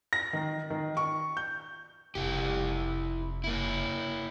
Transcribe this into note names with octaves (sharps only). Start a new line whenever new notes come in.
A#6
D#3
D#3
C#6
G6
F1 E4 G4
A#3 E4